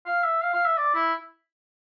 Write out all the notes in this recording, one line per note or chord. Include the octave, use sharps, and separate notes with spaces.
F5
E5
F5
F5
E5
D5
E4